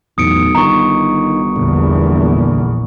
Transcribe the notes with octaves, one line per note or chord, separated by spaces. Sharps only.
B1 E2 A2 D#6 C#7 D7
G1 D#3 A#5 C#6
A#1 E2 A#2 D3